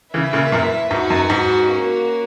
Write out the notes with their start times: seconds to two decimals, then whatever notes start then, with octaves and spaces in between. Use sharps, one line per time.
0.13 C#3 E3 E4 B4 E5
0.33 A#2 C#3
0.52 F#2 A#2
0.90 G#2 D#4 F#4 B4
1.10 F#2
1.30 G#2
1.68 A#3 C#4 F#4